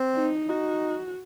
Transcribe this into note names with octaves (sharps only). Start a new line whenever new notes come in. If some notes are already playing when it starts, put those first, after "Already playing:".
Already playing: C4
D#4
D#4 F#4